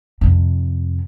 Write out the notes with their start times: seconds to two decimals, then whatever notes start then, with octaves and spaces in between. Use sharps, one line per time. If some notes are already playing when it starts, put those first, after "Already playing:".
0.21 F2 C3